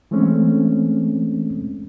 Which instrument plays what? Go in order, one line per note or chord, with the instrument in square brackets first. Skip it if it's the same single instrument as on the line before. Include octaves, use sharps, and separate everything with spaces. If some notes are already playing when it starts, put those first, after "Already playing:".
[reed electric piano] E3 G#3 A3 C4 C#4